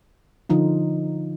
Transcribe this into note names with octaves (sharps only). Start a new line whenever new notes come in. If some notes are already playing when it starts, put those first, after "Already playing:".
D3 F3 D#4 F4